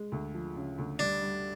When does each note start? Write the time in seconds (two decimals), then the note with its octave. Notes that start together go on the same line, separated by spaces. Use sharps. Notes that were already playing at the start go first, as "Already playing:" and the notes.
Already playing: G#3
0.12 D2
0.34 F3
0.56 C#3
0.78 D2
0.99 G3 D4
1.22 G3